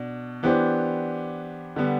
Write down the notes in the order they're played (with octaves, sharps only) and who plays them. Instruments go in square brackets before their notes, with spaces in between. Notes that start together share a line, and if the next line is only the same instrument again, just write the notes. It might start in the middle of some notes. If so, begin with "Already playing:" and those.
Already playing: [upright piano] B2 D4
E3 B3 D4 G4 C5
D3 G3 B3